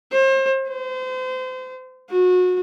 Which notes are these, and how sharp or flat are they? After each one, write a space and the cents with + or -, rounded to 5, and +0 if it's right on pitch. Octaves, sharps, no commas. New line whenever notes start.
C5 +35
C5 -30
F#4 -30